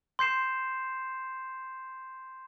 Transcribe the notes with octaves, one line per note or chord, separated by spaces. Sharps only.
C6 G6 C7 E7